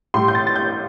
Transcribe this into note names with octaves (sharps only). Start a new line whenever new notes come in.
A2 G3 C6
G6
A6
A6
G6